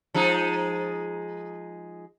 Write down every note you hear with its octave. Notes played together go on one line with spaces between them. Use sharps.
F3 G#3 D#4